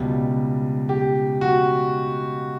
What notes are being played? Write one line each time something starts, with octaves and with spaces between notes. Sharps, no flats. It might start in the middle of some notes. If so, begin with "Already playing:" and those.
Already playing: C#2 B2 G3
G4
F#4